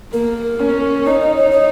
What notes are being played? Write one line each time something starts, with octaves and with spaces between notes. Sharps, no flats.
A#3 A#4
C#4
D#4 C#5
D#5
C#5
C#5